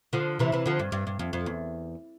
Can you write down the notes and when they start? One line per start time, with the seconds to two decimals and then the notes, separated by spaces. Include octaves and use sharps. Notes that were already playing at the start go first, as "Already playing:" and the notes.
0.13 D3 F3
0.39 C3 E3
0.52 C3 E3
0.66 D3 F3
0.79 G2
0.92 G2
1.07 G2
1.19 F2
1.33 F2
1.46 E2